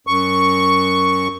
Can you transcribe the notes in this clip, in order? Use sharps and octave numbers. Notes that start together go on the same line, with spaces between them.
F#2 C#6